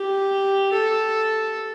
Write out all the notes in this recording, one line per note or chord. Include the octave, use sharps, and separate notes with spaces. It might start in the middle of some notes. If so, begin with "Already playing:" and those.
Already playing: G4
A4